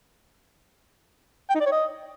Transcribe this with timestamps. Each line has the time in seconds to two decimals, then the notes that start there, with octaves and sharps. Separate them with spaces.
1.50 G5
1.55 D#4
1.61 D5
1.66 C#5
1.72 D#5